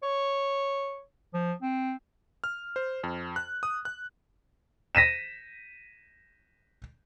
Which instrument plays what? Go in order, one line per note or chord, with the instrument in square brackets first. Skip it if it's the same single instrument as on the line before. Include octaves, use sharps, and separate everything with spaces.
[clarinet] C#5
F3
C4
[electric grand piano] F6
C5
F2
F#6
D#6
F#6
[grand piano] A#6 B6 D#7 E7